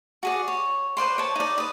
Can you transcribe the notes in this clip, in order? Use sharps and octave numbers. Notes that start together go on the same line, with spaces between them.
F#4 G#4 D5
C#5
B4 C5 D5 C6
C#5 A5
D#4 D5
B4 D#6